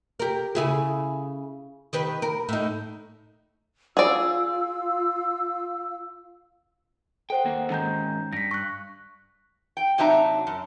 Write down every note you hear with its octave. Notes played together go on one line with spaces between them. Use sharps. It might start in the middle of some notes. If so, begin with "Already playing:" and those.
G4 A#4
C#3 E4 G#4
D#3 G4 B4
A#4
A2 D#4
F4 G#4 D5 F5 E6
A4 C5 F#5 G5
D#2 A#3
D#3 G#3 C#4 A#5 G6
G2 A#6 B6
C#6 F#6
G5
C3 F#3 D4 D#4 E5 A#5
F#2